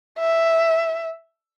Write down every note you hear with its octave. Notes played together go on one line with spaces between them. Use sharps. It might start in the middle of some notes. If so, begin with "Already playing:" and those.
E5